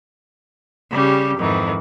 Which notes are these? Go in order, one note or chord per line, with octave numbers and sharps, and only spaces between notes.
C#3 G3 C#4 G4
F2 G#2 D#3 E3